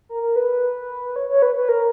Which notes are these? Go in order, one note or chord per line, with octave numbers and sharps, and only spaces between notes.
A#4
A#4
B4
C#5
C#5
B4
B4
A#4